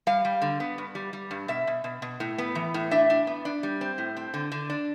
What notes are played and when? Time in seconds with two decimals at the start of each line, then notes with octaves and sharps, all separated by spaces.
0.07 G3 F5
0.25 G3
0.42 D3
0.60 B3
0.78 G2
0.95 G3
1.13 G3
1.31 G2
1.48 B2 E5
1.67 B2
1.84 B2
2.02 B2
2.20 A2
2.38 B3
2.55 E3
2.74 A2
2.91 D4 E5
3.10 D4
3.27 B3
3.45 D4
3.63 G3
3.81 C4
3.98 A2
4.17 C4
4.34 D3
4.52 D3
4.70 D4